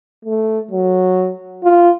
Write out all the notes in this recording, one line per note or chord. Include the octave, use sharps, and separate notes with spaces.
A3
F#3
F4